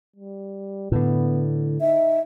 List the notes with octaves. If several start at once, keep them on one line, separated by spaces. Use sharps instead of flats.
G3
A2 D3 B3
D#4 E5